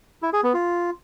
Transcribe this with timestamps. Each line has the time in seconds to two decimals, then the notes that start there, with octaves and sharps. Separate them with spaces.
0.22 E4
0.33 G#4
0.43 B3
0.54 F4